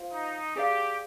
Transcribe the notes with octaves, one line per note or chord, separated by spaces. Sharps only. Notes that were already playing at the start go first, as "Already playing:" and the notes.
Already playing: F4 C5 F5
D#4
G4 G#4 D5 F5